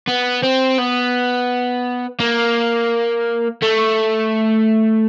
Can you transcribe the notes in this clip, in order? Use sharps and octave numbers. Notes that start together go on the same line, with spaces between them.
B3
C4
B3
A#3
A3